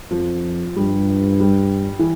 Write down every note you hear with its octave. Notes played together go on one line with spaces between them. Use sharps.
F2 F3
G2 G3
G3
E3